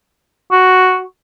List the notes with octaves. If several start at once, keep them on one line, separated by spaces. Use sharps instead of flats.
F#4